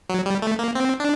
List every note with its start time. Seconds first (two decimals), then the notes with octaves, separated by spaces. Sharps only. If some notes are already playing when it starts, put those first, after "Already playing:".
0.09 F#3
0.26 G3
0.42 A3
0.59 A#3
0.75 C4
1.00 D4